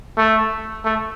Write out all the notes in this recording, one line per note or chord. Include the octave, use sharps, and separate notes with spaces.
A3
A3